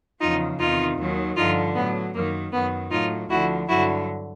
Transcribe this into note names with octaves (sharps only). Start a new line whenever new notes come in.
E2 C#3 F3 D#4 F4
E2 C3 D#3 D#4 F4
D#2 D#3 F#3
G2 D3 F3 D#4 F4
A2 F#3 B3
F#2 D#3 F#3 A#3
F#2 D#3 F#3 B3
A2 F#3 D#4 F4
D2 D3 F3 E4 F#4
G2 D3 F#3 E4 F#4